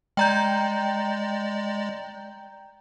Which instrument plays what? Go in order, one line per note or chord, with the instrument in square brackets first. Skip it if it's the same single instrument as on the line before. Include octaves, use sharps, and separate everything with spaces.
[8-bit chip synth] G#3 D5 [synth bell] G5 A#5 G6